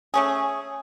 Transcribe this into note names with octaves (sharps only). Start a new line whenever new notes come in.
A3 C#4 G#4